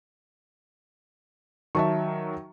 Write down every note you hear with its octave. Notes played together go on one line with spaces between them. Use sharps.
D#3 F#3 E5 A5 C#6